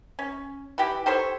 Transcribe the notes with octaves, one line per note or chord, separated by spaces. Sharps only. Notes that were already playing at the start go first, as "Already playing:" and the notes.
C#4
E3 G4
G4 A4 C5 C#5